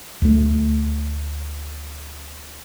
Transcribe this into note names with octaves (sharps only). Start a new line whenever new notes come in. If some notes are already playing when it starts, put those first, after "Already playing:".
D2 A3